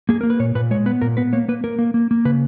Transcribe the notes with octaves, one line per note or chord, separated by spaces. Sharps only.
A#3 G#4
A#3 A#4
B4
A#2 C#5
A#2 B4
G#3 C#5
B3 B4
A#2 A#4
B3 B4
A#3 C#5
A#3 B4
A#3 A#4
A#3
A#3
A#3
C#3 B4